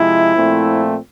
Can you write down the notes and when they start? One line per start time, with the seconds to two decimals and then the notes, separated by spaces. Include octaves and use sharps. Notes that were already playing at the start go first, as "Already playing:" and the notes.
Already playing: C3 F3 G#3 E4
0.36 A#2 F3 A3 C4